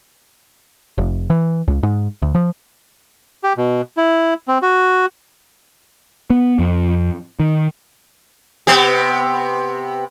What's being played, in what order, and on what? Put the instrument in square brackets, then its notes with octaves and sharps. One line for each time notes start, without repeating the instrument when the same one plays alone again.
[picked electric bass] F1
E3
C#2
G#2
D2
F3
[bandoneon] G4
B2
E4
C4
F#4
[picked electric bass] B3
F2
D#3
[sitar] C3 B3 G4